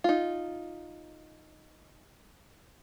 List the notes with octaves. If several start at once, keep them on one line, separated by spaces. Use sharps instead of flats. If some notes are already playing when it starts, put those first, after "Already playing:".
D#4 F4